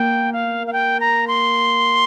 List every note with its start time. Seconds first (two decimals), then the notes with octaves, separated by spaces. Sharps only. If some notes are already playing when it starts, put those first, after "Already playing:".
Already playing: A#3 G5
0.33 F5
0.67 F5
0.73 G5
1.00 A#5
1.28 C6